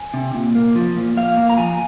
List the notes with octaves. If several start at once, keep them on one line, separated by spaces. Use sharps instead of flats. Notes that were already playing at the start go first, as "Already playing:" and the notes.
Already playing: G#5
C3
A#2
A#3
F3
A#2
A#2 F5
A#3
A#5
F3 G#5